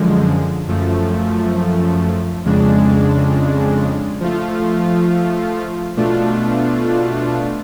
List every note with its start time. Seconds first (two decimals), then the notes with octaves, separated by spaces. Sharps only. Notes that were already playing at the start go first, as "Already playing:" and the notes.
Already playing: F#2 D3 F3 G#3
0.67 F#2 F3 A3
2.45 F2 C#3 G#3 D4
4.20 F3 A3 F4
5.97 B2 A3 D4 F4